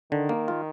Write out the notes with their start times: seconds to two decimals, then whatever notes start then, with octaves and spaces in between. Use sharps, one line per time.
0.11 D3 D#3
0.29 A#3
0.48 F4